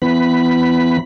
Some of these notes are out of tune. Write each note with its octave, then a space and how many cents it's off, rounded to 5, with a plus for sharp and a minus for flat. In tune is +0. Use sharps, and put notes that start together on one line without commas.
E3 +25 B3 +30 B5 +0